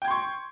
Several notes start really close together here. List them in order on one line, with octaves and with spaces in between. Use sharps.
G5 G#6 C6 C#6